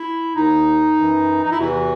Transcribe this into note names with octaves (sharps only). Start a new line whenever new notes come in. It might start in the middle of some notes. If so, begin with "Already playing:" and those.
Already playing: E4
D#2 D#3 D#4
F#2 E3
D#4
E4
E2 C3 E3 F#4